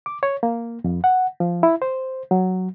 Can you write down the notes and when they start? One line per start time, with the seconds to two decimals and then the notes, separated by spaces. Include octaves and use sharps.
0.06 D6
0.23 C#5
0.43 A#3
0.84 F2
1.04 F#5
1.40 F3
1.63 E4
1.82 C5
2.31 F#3